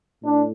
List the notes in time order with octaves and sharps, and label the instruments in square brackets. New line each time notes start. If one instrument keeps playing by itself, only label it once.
[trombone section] A2 D4